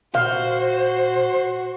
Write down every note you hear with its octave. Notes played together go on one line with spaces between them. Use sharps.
A#2 F#4 C5 F5